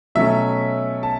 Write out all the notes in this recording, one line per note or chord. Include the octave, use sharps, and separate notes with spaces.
B2 F#3 A3 C#4 E5
A5